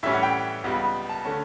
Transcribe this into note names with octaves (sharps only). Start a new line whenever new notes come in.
A2 E3 G3 C#4 E5
F#5
G5
C#2 C#3 G3 B3
A5
D3 A3 C#4